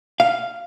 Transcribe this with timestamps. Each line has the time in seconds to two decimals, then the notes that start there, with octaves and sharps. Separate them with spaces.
0.20 F5